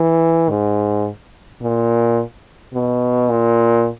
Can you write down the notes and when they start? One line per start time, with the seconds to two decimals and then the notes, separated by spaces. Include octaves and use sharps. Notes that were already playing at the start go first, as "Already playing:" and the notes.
Already playing: E3
0.50 G#2
1.62 A#2
2.74 B2
3.30 A#2